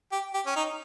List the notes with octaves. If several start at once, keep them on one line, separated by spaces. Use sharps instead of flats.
G4
G4
C#4
D#4